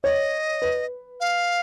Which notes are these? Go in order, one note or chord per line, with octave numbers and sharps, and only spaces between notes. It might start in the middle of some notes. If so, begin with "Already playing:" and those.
C#5 D#5
B4
F5